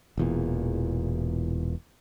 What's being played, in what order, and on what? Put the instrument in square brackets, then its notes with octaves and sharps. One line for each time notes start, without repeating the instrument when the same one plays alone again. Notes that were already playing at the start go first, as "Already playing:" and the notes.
[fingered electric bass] E1 E2 A#2